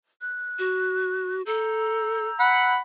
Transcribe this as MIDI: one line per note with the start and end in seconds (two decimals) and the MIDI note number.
0.20 1.35 90
0.59 1.42 66
1.46 2.28 69
1.46 2.74 82
1.46 2.74 88
1.46 2.74 91
2.40 2.78 78
2.40 2.78 83